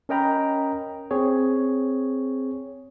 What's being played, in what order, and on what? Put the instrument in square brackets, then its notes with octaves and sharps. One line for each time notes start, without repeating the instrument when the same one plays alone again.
[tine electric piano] C#4 A#4 D#5 G5 A#5 B5
C4 G#4 C#5